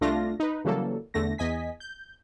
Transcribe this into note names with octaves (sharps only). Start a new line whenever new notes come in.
C2 A3 D4 F4 A#6
D#4 B4
C#3 E3 F#3 G3 A#3 A4
E2 D3 A3 A#6
E2 D#5 G#5 B6
G6